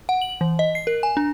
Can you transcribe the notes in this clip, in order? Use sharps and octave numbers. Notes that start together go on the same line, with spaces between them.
F#5
F#7
E3
D#5
C7
A#4
G#5
D4